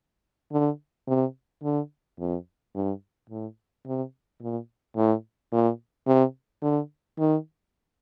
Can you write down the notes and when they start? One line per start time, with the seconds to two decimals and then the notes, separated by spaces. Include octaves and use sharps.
0.52 D3
1.07 C3
1.63 D3
2.19 F2
2.75 G2
3.30 A2
3.86 C3
4.41 A#2
4.96 A2
5.52 A#2
6.07 C3
6.62 D3
7.19 D#3